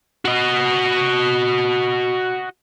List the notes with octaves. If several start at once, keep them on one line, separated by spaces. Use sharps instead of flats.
F#4 D#5